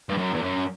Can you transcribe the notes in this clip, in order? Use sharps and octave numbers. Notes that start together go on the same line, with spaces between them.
G2
F#2
E2
F#2